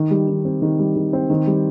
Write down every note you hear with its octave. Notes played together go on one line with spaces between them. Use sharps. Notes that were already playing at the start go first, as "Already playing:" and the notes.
Already playing: D#3
G3
D#3
C4
D#3
G3
D#3
C4
D#3
G3